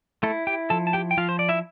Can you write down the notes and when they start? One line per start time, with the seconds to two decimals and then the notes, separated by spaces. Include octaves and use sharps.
0.23 A3 E4 A4
0.47 G4 G5
0.70 F3 A4 A5
0.87 A5
0.93 G4 G5
1.11 G5
1.17 F3 F4 F5
1.29 C5
1.39 D5
1.49 E4 E5